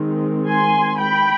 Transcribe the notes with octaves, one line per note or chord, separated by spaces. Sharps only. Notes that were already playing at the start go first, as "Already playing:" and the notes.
Already playing: D#3 G#3 C4
G#5 C6
G5 B5